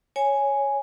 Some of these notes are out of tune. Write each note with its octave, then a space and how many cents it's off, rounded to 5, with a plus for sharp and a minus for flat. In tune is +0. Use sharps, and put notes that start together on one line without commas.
C#5 +0 G#5 +0